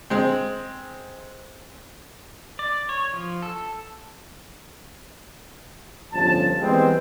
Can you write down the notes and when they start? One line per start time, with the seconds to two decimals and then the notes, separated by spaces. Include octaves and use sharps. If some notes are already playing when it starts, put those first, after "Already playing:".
0.10 G#3 C4
2.59 D5
2.89 C#5
3.13 F3
3.43 A4
6.13 G1 A2 F3 C#4 A5
6.60 E3 G3 G#3 B3 C4